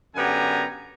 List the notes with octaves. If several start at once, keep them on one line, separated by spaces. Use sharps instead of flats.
F#2 D3 B3 G4 G#5 A#5